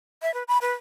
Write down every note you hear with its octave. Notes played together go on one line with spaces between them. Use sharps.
E5
B4
B5
B4